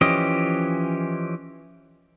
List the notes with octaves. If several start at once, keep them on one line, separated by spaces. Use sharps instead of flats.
E3 F3 C#4 G4 D#5